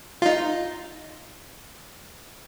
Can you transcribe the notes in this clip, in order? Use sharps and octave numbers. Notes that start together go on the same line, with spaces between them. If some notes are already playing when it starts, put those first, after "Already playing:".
D#4 F4